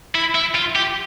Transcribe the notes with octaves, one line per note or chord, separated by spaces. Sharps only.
E4
E4
F4
G4